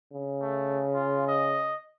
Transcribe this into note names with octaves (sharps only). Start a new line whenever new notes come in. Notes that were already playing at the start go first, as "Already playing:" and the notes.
C#3
A3
F4
D#5